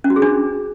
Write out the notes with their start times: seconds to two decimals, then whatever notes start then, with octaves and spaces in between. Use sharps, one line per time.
0.04 C#4
0.10 F#4
0.16 G#4
0.22 D4